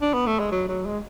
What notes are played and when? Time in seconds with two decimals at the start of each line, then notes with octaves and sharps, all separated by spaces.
0.02 D4
0.14 B3
0.27 A3
0.39 G#3
0.52 F#3
0.69 F#3
0.86 G#3